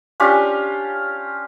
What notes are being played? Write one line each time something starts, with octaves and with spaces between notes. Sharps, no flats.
C#4 D4 F4 G4